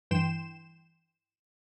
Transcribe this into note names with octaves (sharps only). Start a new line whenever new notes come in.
G2 E3 G5 C6 E7